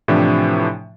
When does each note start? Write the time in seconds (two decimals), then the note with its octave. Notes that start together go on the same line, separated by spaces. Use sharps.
0.08 A2 C3 E3 F3 D4 G4